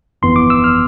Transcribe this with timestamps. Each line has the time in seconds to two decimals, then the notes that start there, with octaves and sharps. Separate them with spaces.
0.22 G1 F2 E3 B3 C6
0.36 D6
0.50 E6
0.64 F6